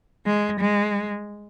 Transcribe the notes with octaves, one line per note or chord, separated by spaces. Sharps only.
G#3
G#3